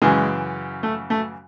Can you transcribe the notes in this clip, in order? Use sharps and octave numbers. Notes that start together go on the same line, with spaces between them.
F#2 C#3 E3 G#3
A3
A3